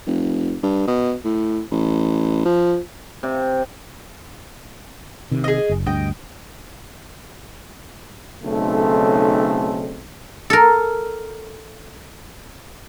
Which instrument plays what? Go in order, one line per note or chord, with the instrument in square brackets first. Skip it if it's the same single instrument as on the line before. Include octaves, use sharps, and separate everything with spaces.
[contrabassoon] F1
G2
B2
A2
A1
F3
[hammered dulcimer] C3
[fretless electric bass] C3 D#3
[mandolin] G#4 D#5
[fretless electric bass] F#1
[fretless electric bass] D2 G2 [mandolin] D#5 G5
[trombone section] B1 C#3 A3 C4 D#4 A4
[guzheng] A4 A#4